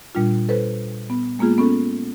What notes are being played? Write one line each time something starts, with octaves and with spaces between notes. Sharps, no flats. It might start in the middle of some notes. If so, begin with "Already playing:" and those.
A#2 G3 D4 F4
A4 B4 C5
B3
G#3 A#3 B3 F4 G#4
B3 C#4 A4